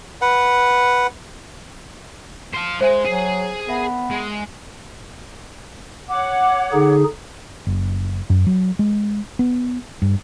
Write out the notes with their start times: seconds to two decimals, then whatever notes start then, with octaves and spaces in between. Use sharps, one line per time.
0.22 B4 F#5
2.53 C5 F5
2.81 G#3 C5 E5 G#5
3.05 F#3 G#4
3.69 B3 A#4 E5 G#5
4.11 G#3
6.09 C#5 F#5 D6
6.73 D3 D#4 G#4
7.67 F#1
8.30 F#2
8.47 F#3
8.79 G#3
9.39 B3
10.02 G2